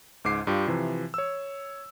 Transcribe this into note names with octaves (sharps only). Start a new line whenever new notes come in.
C#2 G#2 D6 C7
G2 F4 G4
C3 E3 F3
C#5 E6